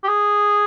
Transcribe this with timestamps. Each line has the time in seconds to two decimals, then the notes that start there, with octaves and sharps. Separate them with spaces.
0.04 G4
0.09 G#4